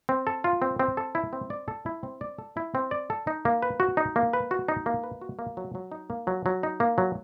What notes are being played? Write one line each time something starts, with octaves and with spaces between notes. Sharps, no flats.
C4
A4
F4
C4
C4
A4
E4
C4
D5
A4
E4
C4
D5
A4
E4
C4
D5
A4
D#4
A#3
B4
F#4
D#4
A#3
B4
F#4
D#4
A#3
B4
F#4
A#3
F#3
F#3
D#4
A#3
F#3
F#3
D#4
A#3
F#3